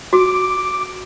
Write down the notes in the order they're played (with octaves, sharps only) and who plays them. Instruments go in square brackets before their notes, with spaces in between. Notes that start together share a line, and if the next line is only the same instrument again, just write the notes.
[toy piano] F#4 [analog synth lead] D6